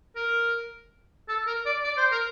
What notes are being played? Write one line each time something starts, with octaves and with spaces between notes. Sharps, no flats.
A#4
A4
A#4
D5
D5
C5
A#4